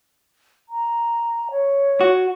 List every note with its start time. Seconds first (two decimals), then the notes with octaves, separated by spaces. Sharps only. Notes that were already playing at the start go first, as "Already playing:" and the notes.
0.69 A#5
1.51 C#5
2.01 F#4